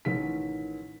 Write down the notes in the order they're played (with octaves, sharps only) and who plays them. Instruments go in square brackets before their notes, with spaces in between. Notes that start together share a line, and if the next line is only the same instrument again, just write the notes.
[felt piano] A1 D#3 B6